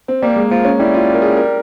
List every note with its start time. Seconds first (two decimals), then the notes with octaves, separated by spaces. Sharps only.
0.08 C4
0.22 G3 A#3
0.36 G#3
0.51 F3 A#3
0.65 C#4
0.79 G3 E4
0.94 F4
1.14 A#4
1.22 G#4
1.37 A#4